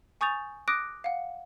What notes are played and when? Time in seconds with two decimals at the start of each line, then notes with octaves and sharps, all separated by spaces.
0.21 G#5 C#6 D#6 G6 A6 F7
0.68 D6 D#6 F#6 A#6 D7
1.04 F5 F#5